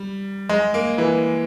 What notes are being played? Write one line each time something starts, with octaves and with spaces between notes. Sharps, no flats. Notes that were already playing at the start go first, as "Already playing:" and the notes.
Already playing: G3
G#3
A#3
E3